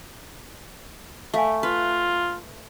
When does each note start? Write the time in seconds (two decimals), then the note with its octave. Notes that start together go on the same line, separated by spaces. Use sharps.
1.34 A3 E5 F5 G#5
1.63 F4 B4